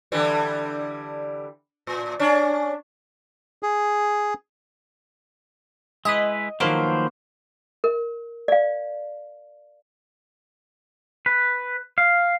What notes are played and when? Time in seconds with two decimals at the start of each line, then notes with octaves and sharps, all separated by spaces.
0.12 D3 E3 G3
1.87 A2
2.20 C#4 D4
3.63 G#4
6.05 G#3 E4 B4 D#5
6.60 D#3 F3 F#3 A#3 B3 C5
7.84 A#4
8.48 D5 F5
11.26 B4
11.98 F5